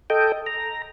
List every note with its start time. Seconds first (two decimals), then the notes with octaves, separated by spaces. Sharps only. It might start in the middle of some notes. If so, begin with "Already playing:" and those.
0.10 A4 D#5 G5
0.46 A#5